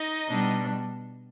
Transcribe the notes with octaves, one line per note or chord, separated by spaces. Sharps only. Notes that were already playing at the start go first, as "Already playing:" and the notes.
Already playing: D#4 D#5
B2 G3 B3 D4